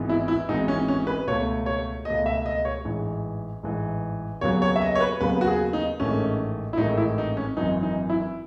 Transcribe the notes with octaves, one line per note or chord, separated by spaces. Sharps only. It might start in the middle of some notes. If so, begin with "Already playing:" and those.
Already playing: G#1 G#2 E3 B3
E4
E4
G#1 G#2 E3 B3 D#4
C#4
C#4
B4
C#2 B2 A3 C#5
C#5
C#2 B2 A3 D#5
E5
D#5
C#5
A1 G#2 E3
A1 G#2 E3
D#2 C#3 F#3 B3 C#5
C#5
E5
D#5
C#5
B4
D#2 C#3 F#3 B3 B4
F#4
G#4
D#4
A1 G#2 D#3 A3 C#4
E4
A1 G#2 D#3 A3 D#4
E4
D#4
C#4
G#1 F#2 E3 D#4
D#4
E4